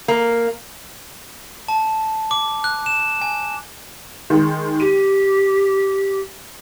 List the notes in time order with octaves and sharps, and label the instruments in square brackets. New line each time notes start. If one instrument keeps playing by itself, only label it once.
[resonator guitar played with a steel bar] A#3
[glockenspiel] A5
D6
F#6
E7
G#5
[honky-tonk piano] D#3 G#3
[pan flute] G4 [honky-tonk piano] D#7